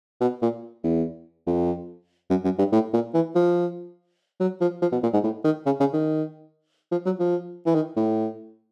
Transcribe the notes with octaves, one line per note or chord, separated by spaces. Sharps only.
B2
A#2
E2
F2
F#2
F#2
G2
A2
A#2
E3
F3
F#3
F3
F3
B2
A#2
G#2
A2
D#3
C#3
C#3
D#3
F3
F#3
F3
E3
D#3
A2